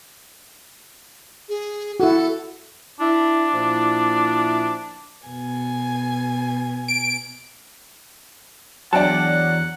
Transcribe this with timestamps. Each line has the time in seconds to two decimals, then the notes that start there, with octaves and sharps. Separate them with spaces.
1.49 G#4
2.00 E4 F#4 A4
3.00 D4 E4
3.54 A#2 F3 E4
5.27 B2 G#5
6.88 D7
8.93 E2 F#3 D4 F#5 G5 A5